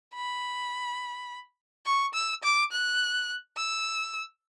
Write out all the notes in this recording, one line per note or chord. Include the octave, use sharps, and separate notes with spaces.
B5
C#6
E6
D6
F#6
E6